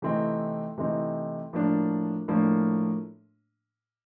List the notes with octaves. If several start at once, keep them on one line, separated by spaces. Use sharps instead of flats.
C3 E3 A3 C4 D#4
C3 E3 A3 C4 D#4
A2 F3 A#3 D4
A2 F3 A#3 D4